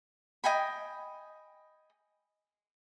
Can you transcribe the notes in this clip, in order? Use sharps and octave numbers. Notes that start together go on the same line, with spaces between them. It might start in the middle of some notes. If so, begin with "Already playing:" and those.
D#5 G5 G#5 B5